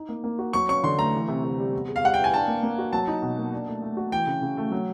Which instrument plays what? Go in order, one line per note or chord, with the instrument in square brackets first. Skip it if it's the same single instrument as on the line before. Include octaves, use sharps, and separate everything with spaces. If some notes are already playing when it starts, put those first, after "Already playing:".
Already playing: [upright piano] D#4
A#3
A#3
F#4
[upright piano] F#3 [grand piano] C#6
[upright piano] C#4 [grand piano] C#6
[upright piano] D3 [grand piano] C6
[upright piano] A3 [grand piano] A#5
[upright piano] E3
C3
C3
G3
B3
G#4
[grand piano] F5
[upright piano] G3 [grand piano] F#5
[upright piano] E4 [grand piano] G5
[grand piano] G#5
[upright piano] D4 [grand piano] A5
[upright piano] A#3
A#3
F#4
[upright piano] F#3 [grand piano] A5
[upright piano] D#4
B2
A#3
D4
A3
A3
F#4
[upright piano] E3 [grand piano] G5
[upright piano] C#3
C#3
A3
F#3